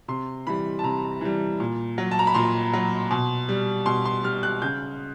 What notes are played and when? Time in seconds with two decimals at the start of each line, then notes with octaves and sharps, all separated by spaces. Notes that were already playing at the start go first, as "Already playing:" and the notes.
0.08 C3 C6
0.47 E3 G3 B5
0.79 A5
0.84 C3 A#5
1.21 E3 G3
1.60 A#2
1.98 F#3
2.11 A5
2.19 A#5
2.27 B5
2.34 A#2 C6
2.73 F#3
3.11 B2
3.49 G3
3.86 B2 C6
4.05 C6
4.23 G3 F6
4.43 F#6
4.62 C#3 G6